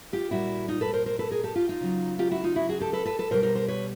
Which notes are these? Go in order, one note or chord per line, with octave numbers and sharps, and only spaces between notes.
F4 G4
A#2 G3 E4 F#4
D#4 F4
A4 B4
A#4 C5
A#4 C5
A4 B4
G#4 A#4
G4 A4
F4 G4
D#4 F4
C#3 F#3
F4 G4
E4 F#4
D#4 F4
E4 F#4
F#4 G#4
G4 A4
A4 B4
A4 B4
A4 B4
B2 G3 A#4 C5
A#4 C5
A#4 C5
B4 C#5